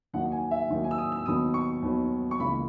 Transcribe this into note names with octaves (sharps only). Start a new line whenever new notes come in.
D#2 D#3 F#3 A#3 D#4 F#5
G#5
E5
D#2 D#3 F#3 A#3 D#4
G#5
E6
D#6
E6
D#2 D#3 F#3 B3 D#4 D#6
C#6
D#2 D#3 F#3 B3 D#4
C#6
C#2 C#3 E3 A#3 B5